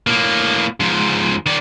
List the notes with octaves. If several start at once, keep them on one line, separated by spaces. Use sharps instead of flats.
A2 A#3
G#2 F3
D#3 D5